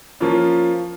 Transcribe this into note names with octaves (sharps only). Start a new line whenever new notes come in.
F3 A#3 C#4 F4